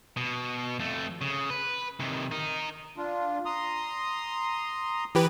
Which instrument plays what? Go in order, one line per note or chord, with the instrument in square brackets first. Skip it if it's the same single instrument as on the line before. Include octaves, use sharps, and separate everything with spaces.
[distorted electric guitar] B2
F2 A3
C#3
B4
C3 D#3
D#4 A#4
[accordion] D4 F4
A#5 C6 D#6
[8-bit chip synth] E3 G4 B4